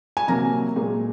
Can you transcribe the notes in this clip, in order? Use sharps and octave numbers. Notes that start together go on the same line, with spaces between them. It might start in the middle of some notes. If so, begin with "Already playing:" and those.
G#5
C3 F#3 A#3 A#5
A#2 G#3